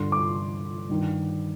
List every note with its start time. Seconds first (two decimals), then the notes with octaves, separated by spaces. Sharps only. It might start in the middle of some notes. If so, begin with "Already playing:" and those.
Already playing: G2 D3 C6
0.12 D6
0.89 G2 D#3